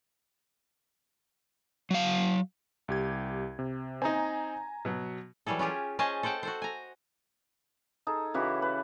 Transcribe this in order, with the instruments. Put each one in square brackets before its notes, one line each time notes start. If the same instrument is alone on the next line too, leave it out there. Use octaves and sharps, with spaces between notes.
[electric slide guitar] F#3 F5
[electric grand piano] C2 G4 G#6
C3
[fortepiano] C4 D#4 [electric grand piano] G#5 A#5
[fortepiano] B2 F#3
[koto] E3 F#3 G3 G#4 A4
C#4 F4 G4 G#4
C#4 G#4 C5 D#5 G#5 A5
A4 C5 F#5 G5 A5
F#4 A4 C5
G#5 A#5
[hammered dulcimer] D#4 G#4 A4
C#3 E3 F#4 G4
B4